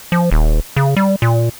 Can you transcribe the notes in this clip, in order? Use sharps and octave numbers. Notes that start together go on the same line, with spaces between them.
F3
D#1
C#3
G3
A#2